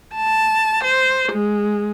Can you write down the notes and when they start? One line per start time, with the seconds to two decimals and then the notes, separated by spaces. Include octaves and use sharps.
0.15 A5
0.84 C5
1.32 G#3